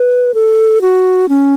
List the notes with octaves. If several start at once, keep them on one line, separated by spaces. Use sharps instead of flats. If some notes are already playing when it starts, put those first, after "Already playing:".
Already playing: B4
A4
F#4
C#4